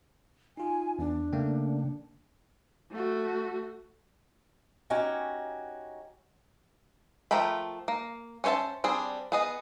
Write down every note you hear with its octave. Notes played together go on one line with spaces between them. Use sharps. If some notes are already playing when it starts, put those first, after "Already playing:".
D#4 F4 G#5
E2 D4
C#3 A3 A#3 G5
A3 F#4
C#4 D#4 F#4 G4 G#5
F3 A3 A#4 G5 B5
A#3
C#4 C5 C#5 E5 A5
G3 C4 D4 G#4
B3 G#4 D#5